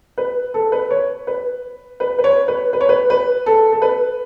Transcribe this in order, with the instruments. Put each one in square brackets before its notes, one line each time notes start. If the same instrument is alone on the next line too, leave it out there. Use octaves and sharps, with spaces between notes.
[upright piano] B4
A4
B4
C#5
B4
B4
B4
C#5
B4
B4
C#5
B4
B4
A4
A4
B4